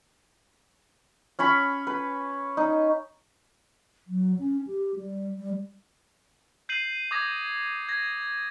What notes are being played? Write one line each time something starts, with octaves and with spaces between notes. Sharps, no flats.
C#4 C#5 B5 C#6
B4
D#4
F#3
C#4
G4
G3
G3
G6 C7 D#7 F#7
D6 D#6 G#6 A#6
G#6 A#6